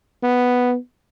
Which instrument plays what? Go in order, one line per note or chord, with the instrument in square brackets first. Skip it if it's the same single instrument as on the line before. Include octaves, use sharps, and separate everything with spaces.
[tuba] B3